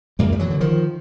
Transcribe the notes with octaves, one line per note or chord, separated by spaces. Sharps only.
F#2 G#3 A#3
G3
E3 F#3
D3
D#3 F3